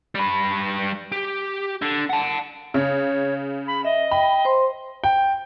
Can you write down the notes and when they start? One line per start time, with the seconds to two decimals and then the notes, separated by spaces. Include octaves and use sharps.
0.15 G3 B4
1.12 G4
1.82 D3
2.10 F#5 A5
2.74 C#3 C#5
3.67 B5
3.85 D#5 E5
4.11 G5 B5
4.45 C5 C6
5.04 G5